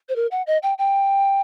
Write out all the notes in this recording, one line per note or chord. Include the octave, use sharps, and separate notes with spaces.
C5
A#4
F#5
D#5
G5
G5